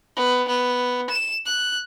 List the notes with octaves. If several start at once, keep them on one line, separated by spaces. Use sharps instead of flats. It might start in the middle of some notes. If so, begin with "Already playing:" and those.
B3
B3
E7
F#6